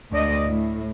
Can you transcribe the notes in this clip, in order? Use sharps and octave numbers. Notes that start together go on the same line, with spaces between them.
D2 D5 D#5
A2